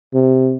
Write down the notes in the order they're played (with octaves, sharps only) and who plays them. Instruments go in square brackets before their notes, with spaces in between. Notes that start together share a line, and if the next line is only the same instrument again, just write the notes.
[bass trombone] C3